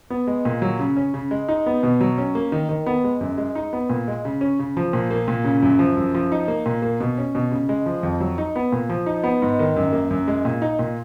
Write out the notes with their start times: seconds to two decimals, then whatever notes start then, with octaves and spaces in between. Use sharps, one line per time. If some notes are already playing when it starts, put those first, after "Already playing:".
0.10 B3
0.27 G#3
0.45 A#2
0.62 F#3
0.80 C#3
0.97 C#4
1.14 C#3
1.31 G#3
1.49 D#4
1.66 B3
1.83 B2
2.01 F#3
2.18 C#4
2.35 A#3
2.52 D#3
2.69 D#3
2.86 B3
3.04 G#3
3.21 F#2
3.38 G#3
3.55 D#4
3.73 B3
3.90 A#2
4.08 G#3
4.25 C#3
4.41 C#4
4.59 C#3
4.77 F3
4.93 A#2
5.10 A#3
5.28 A#2
5.45 C#3
5.62 F#2
5.79 F3
5.97 F#2
6.14 F3
6.32 D#4
6.48 A#3
6.66 A#2
6.82 A#3
7.00 B2
7.18 C#4
7.35 B2
7.52 C#3
7.69 G#3
7.86 F3
8.03 F2
8.21 F#3
8.38 D#4
8.56 B3
8.72 A#2
8.89 F3
9.06 D#4
9.24 B3
9.42 G#2
9.59 D#3
9.76 F#2
9.93 A#3
10.11 F#2
10.28 G#3
10.45 A#2
10.62 D#4
10.79 A#2